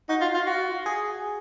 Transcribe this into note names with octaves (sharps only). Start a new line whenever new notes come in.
D#4 F#4
F4
F4
F#4
G#4